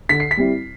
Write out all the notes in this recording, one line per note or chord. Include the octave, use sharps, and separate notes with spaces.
D3 B6
C7
B6
G3 C4 E4